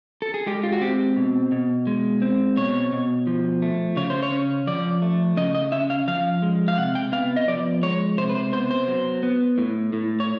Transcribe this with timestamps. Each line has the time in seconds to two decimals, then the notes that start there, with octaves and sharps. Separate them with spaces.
0.22 A4
0.34 G#4
0.46 G#3 G4
0.63 F4
0.73 F#4
0.81 C4 G4
1.17 B2
1.52 B2
1.87 G#3
2.22 C4
2.57 B2 C#5
2.92 B2
3.27 F3
3.62 A3
3.97 C#3 C#5
4.10 C5
4.22 C#5
4.32 C#4
4.67 F3 D5
5.02 A3
5.37 C#3 D#5
5.55 D#5
5.72 C#4 E5
5.90 F5
6.08 F3 F5
6.42 G#3
6.68 F5
6.78 C3 F#5
6.95 G5
7.12 B3 F5
7.36 D#5
7.48 F3 D5
7.83 G#3 C#5
8.18 C3 C5
8.29 B4
8.35 C5
8.53 B3 C5
8.71 C5
8.88 F#3
9.23 B3
9.58 A2
9.93 A2
10.20 C#5